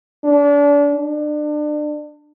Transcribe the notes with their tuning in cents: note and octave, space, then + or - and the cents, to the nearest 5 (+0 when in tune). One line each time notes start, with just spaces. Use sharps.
D4 -30
D4 +30